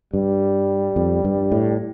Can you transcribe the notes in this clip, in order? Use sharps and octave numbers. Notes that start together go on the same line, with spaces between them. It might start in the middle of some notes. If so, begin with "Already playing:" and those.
G2 G3
F2
G2
A2